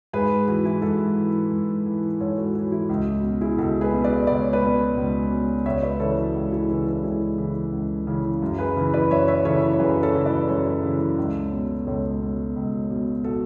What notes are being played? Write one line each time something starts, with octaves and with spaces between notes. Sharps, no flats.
G#2 G#4 B4
E3 F#4
E4 G#4
G#2 F#4 A4
E3
G#2
E3
G#2 A4 C#5
F#4 A4
E3 F#4
E4
C#2 F#4
F#4
B2 F#4
E4 G#4
C#2 F#4 A4
G#4 B4
B2
B4 D5
C#2 D5
C#5
B4 D5
B2
C#2
B2
C#2 C#5 E5
B4 D5
C#3 E3 A4 C#5
F#4
C#2 F#4
E4 G#4
C#3 E3 G#4 B4
F#4 A4
C#2 E4 G#4
C#3 E3
C#2
C#3 E3
F#2
G#4 B4
C#3 E3
B4 D5
F#2 C#5 E5
C#5 E5
C#3 E3 A4 C#5
C#5
F#2 G#4 B4
A4 C#5
C#3 E3
B4 D5
F#2 A4 C#5
C#3 E3
C#2
B2
C#2 A4 C#5
B2
C#2
B2
F#4 A4